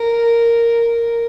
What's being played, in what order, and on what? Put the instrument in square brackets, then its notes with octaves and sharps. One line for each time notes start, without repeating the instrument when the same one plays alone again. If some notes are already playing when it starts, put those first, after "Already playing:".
Already playing: [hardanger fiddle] A#4